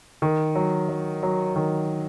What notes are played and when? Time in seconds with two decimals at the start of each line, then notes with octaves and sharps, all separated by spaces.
0.22 D#3
0.55 F#3
0.89 F#3
1.23 F#3
1.56 D#3